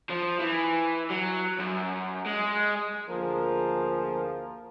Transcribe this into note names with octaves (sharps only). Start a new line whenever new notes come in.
F3
E3
F#3
F#2
G#3
D2 F3 A#3 F4 G#4 A#4